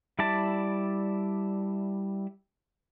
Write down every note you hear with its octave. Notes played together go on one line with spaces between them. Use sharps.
G3 E4 D5 E5 A5